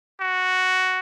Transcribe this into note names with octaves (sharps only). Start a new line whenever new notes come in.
F#4